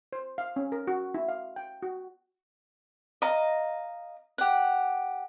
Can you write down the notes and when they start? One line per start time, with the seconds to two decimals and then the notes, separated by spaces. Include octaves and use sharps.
0.13 C5
0.38 F5
0.56 C#4
0.72 A#4
0.87 F#4
1.14 E4
1.29 F5
1.56 G5
1.82 F#4
3.22 D#5 F5 A#5
4.38 G4 F#5